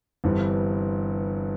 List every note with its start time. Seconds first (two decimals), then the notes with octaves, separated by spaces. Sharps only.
0.24 G1 G2 E3 C4